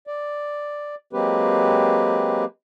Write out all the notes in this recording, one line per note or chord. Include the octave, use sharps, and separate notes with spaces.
D5
F#3 G#3 A#3 C4 G4 B4